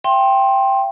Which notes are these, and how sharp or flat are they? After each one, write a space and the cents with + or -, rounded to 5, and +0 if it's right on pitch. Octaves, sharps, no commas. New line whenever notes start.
E5 +45 G5 +0 C6 +20